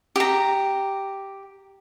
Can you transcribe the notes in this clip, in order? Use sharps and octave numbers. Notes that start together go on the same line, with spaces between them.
G4 A#5